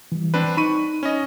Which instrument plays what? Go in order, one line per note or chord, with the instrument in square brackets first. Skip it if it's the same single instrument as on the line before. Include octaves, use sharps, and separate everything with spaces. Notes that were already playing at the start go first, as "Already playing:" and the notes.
[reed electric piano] E3 G3
[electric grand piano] C4 D4 B4
[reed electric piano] D#4 [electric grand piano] B5 C#6 D#7
[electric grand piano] C#4 D#5